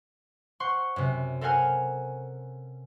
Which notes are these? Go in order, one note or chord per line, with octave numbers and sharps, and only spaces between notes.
C5 F#5 C6 C#6
F#2 C3
A4 A#4 C5 F#5 G#5 F6